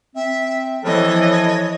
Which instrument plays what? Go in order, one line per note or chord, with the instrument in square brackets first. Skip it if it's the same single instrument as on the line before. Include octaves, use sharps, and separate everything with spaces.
[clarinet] C4 [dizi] E5
[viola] E3 D#5 [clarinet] F3 [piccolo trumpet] A4 [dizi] C#5